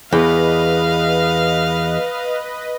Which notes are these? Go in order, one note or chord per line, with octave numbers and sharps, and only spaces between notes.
E2 B4 D#5 F5